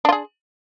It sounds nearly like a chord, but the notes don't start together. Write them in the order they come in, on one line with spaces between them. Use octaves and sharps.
D4 F4 G#4